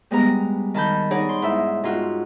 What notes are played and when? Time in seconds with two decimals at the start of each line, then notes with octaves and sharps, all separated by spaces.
0.11 G3 G#3 B3 A#5
0.74 D#3 A5 B5 G6
1.11 D#4 G#4 C#5 D5 F#5
1.29 C6
1.42 G#2 E4 E5
1.84 G#2 F4 F#4